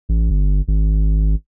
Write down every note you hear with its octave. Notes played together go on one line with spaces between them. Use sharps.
A1
G1
G#1